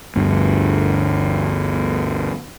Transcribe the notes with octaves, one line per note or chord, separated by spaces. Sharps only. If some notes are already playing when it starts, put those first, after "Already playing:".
G1 D2 G2